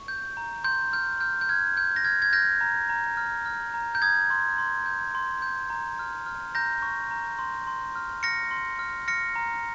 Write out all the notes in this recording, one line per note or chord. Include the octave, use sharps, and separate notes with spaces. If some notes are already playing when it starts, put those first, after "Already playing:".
Already playing: C#6
G6
A#5
C6 G6
F6 G6
F6 G6
G6
F6 G#6
F6 G6
A#6
F6 G#6
G#6
F6 G6 A#6
A#5
A#5
F6
F6
A#5
G6
D#6 G#6
C6
C6
G6
C6
G6
A#5
F6
F6
A#5 G6 A#6
C#6
A#5
C6
C6
F6
F6 A#6 C#7
C6
F6
F6 A#6 C#7
A#5